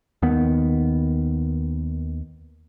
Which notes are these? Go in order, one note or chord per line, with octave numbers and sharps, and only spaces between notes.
D#2 D#3 B3